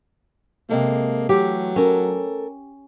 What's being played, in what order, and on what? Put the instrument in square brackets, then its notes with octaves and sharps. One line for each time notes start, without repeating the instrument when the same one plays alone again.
[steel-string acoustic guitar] C3 G#3 A4 [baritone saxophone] A#3
[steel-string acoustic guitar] E3 A3 [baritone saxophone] F#3 [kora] G4
[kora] C#4 [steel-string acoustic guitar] A4 A#4